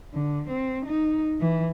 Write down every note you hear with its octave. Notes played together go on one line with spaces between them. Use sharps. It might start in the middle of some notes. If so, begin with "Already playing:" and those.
D3
C4
D#4
E3